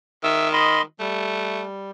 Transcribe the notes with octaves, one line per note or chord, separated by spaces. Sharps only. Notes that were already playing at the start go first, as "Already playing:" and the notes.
D#3 E5 E6
D#5 B5 C6
G3 A3